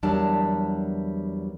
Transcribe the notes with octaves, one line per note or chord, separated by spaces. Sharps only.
E2 F#3 G3 D4 A#4 A5